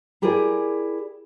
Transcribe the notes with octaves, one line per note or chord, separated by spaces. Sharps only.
E4 G4 G#4 A#4 D5